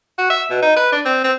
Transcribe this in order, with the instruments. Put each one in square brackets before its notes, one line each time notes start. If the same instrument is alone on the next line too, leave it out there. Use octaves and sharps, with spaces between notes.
[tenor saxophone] F#4
E5
B2
D#4
B4
D4
C4
C4